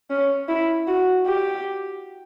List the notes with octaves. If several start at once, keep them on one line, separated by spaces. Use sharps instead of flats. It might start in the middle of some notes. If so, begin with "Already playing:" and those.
C#4
E4
F#4
G4